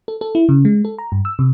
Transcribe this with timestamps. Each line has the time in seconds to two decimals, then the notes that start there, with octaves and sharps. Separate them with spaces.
0.08 A4
0.21 A4
0.35 E4
0.49 C#3
0.65 G#3
0.85 A4
0.98 A#5
1.12 G2
1.25 E6
1.39 C3